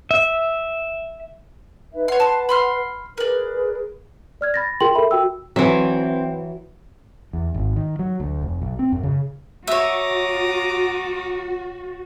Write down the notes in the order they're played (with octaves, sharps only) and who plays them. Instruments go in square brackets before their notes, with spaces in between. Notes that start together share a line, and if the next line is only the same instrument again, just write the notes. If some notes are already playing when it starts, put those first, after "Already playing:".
[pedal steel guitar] E5
[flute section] D#4 B4 E5
[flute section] B4 F#5 [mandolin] C#5 C6
[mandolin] A5 C6
B5 C6 F6
[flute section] G#4 B4 [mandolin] A#4 D5
[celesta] D5 F6 G#6
B5 A6 A#6
F4 G#4 A#4 G5 C6 F#7
A4 A#4 E5 B5
F#4 G5 E6
[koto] E3 E5 [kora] F#3 [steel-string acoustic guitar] C4
[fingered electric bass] E2
G#1
D#3
F#3
D2
F1
B1
C4
F#2
C#3
[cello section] F#4 [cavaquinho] C#5 E5 [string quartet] A#5 D6 D#6